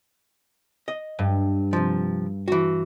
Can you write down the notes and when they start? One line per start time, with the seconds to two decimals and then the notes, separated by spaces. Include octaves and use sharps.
0.88 D#5
1.19 G2
1.73 C3 F3
2.48 E3 F#4